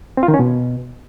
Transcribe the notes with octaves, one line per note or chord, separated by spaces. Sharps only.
C4
F4
D#3
C#4
B2